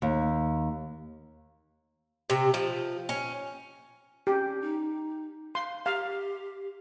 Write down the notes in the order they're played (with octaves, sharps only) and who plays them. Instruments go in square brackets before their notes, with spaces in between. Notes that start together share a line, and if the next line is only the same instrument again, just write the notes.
[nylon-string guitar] D#2
[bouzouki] C3
F3
C#4
[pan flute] C#4 [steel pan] G4
[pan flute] D#4
[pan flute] F5 [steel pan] C6
[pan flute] G4 [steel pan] F5